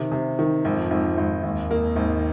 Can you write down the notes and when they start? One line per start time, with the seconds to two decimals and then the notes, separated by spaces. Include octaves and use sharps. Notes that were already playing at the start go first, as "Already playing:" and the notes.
Already playing: C3 D#3
0.12 C3
0.39 D#3
0.64 G#1 F2 F3
0.91 G#1
1.18 G#1
1.43 G#1 D#2 D#3
1.71 A#3
1.96 G#1